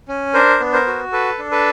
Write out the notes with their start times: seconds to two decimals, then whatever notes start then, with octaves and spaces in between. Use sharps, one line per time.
0.08 C#4
0.34 D4 A#4 C5
0.61 B3
0.73 A#4 C5
0.87 F#4
1.12 A4 B4
1.39 D4
1.51 A4 B4